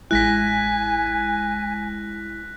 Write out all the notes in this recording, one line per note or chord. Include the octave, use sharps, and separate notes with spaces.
A1 G#3 E4 G#5 F#6 A#6 B6